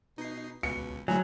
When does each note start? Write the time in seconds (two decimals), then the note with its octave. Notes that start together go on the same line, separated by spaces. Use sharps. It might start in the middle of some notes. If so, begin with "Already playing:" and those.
0.18 B2 D#4 C7
0.63 C#2 B2 C#7
1.08 G#2 D3 F#3 A3 E4 G#5